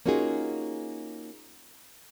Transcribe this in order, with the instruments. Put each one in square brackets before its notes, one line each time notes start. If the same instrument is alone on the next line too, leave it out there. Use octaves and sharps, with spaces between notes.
[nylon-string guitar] A#3 C#4 D#4 F4 F#4 G#4